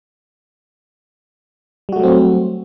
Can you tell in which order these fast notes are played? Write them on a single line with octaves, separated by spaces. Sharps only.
G3 F#4 A3 F#3 C4